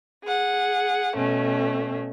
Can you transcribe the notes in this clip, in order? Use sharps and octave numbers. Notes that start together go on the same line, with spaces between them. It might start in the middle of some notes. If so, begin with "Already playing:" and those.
G#4 F#5
B2 A3 C#4